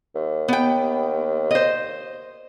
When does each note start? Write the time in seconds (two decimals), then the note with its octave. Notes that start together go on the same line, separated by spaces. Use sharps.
0.15 D#2
0.48 B3 G5
1.51 C5 D#5